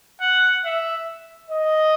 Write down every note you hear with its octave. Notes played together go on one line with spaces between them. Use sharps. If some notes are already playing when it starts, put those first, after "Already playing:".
F#5
E5
D#5